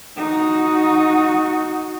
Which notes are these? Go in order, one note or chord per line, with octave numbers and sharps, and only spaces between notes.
D#4 F#4